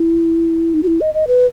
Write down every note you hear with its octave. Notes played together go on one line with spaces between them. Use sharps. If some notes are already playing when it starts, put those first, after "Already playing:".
Already playing: E4
D#4
F#4
E4
D#5
D#5
B4